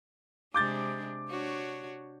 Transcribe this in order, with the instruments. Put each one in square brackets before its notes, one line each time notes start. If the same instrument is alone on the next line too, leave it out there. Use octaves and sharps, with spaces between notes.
[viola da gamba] C3 G#3 D4 [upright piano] D6 G6 A6
[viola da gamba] D4 F#4 C#5